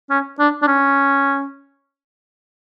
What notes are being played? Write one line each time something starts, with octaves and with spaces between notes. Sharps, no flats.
C#4
D4
D4
C#4